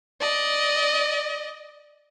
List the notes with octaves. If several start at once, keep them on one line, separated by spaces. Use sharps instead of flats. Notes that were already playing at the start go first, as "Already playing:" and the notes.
D5 D#5